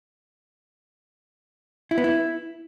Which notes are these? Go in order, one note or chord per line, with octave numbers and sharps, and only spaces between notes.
E4
B3
E4